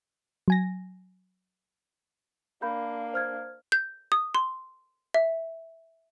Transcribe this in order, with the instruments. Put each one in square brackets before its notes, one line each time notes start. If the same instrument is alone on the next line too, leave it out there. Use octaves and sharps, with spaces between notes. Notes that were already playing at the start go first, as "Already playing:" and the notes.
[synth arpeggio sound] F#3 G#5 A#6
[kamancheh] A#3 D4 [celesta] F5 B5 G6
[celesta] C5 F6 G#6
[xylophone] G6
D#6
C6
E5